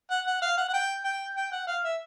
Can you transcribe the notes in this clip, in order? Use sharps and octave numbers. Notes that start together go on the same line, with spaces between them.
F#5
F#5
F5
F#5
F#5
G5
G5
G5
F#5
F5
E5